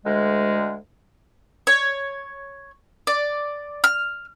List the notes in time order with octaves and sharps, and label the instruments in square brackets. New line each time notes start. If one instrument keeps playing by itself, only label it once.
[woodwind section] D2 G#3
[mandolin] C#5
D5
F6